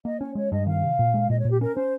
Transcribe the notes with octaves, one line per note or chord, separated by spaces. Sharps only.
A#3 D#5
C#4 C#5
G#3 C#5
G2 D#5
D#3 F5
C3
A#2
G#3
A#2 D#5
A#2 C#5
G4
C#4 A#4
C#4 C5